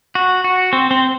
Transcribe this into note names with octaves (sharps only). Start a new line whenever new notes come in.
F#4
F#4
C4
C4